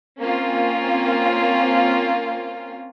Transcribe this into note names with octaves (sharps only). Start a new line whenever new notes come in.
A#3 C4 C#4 F4